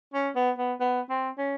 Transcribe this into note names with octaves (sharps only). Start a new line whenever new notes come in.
C#4
B3
B3
B3
C4
C#4